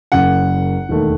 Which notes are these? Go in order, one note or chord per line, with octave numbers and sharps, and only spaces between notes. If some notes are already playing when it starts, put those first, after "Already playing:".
F#1 F#2 C#3 F#5
E1 D#2 D#3 A3